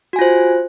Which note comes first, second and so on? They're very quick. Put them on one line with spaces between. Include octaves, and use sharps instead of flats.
F#4 G#5 F4 C5